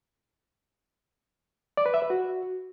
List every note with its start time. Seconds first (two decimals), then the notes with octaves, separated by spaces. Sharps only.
1.77 D5
1.86 B4
1.94 E5
2.02 B4
2.10 F#4